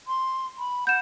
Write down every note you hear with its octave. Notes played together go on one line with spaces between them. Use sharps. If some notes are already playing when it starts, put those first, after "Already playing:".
C6
B5
F#5 G6 E7